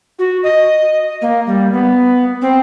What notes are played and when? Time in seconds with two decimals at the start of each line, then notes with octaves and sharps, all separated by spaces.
0.19 F#4
0.43 D#5
1.22 A#3
1.47 G3
1.72 B3
2.42 C4